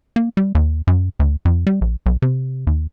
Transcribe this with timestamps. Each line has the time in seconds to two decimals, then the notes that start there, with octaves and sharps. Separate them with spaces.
0.16 A#3
0.37 G3
0.55 D#2
0.87 F#2
1.19 D2
1.45 F2
1.67 G3
1.81 A#1
2.06 B1
2.22 C3
2.67 D#2